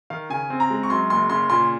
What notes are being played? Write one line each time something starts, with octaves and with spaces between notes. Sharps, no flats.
D#3 F5
C#3 G#5
C4
A#5
G#3
C#6
F#2 C6
F#1 C6
C#3 C6
A#2 C6